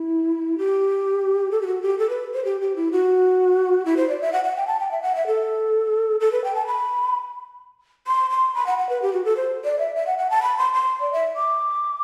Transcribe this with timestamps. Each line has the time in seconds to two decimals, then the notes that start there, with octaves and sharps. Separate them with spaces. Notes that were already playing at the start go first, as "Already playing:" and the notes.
Already playing: E4
0.58 G4
1.51 A4
1.62 G4
1.66 F#4
1.82 G4
1.99 A4
2.09 B4
2.34 C5
2.45 G4
2.61 G4
2.76 E4
2.92 F#4
3.85 E4
3.97 C5
4.09 D5
4.21 E5
4.33 F#5
4.44 F#5
4.56 G5
4.67 A5
4.80 G5
4.91 E5
5.02 F#5
5.15 E5
5.27 A4
6.20 A4
6.32 B4
6.44 G5
6.55 A5
6.67 B5
8.07 C6
8.30 C6
8.55 B5
8.66 F#5
8.78 F#5
8.89 B4
9.02 G4
9.13 F#4
9.25 A4
9.37 C5
9.64 D5
9.79 E5
9.95 E5
10.07 F#5
10.18 F#5
10.30 A5
10.43 B5
10.58 C6
10.74 C6
11.00 D5
11.12 E5
11.36 D6